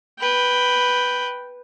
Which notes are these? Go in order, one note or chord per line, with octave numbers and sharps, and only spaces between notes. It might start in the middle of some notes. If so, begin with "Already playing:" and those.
B4 G5